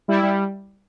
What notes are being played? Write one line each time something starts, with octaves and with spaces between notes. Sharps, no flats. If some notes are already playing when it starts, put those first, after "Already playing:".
G3 E4
G3